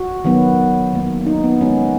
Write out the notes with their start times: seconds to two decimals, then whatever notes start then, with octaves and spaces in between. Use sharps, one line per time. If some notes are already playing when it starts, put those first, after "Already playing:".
Already playing: F#4
0.24 D#3 F#3 B3
0.93 D#3 A#3
1.26 D#4
1.44 B3
1.61 D#3 G#3 B3 C#4